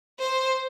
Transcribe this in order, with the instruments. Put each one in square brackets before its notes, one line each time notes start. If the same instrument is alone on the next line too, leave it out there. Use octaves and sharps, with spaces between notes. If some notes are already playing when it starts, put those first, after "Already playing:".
[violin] C5